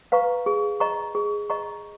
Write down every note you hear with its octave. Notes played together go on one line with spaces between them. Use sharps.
B4 F5 A#5 C#6
G#4
D#5 A#5 C#6
G#4
D#5 A#5 C#6